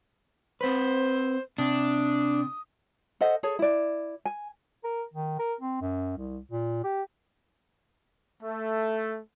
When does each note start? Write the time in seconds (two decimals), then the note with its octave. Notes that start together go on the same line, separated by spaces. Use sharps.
0.61 C4 B4 C5
1.58 C3 D4 D#6
3.21 A4 C5 D#5 F#5
3.43 G#4 A4 C#5
3.59 E4 D5
4.25 G#5
4.84 A#4
5.14 D#3
5.39 A#4
5.61 C4
5.82 F#2
6.18 C2
6.51 A#2
6.84 G4
8.42 A3